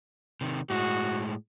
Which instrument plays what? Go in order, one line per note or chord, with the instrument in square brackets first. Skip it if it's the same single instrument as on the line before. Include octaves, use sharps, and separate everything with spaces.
[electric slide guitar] C3 D#3
[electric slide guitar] A2 G#3 [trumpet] F#4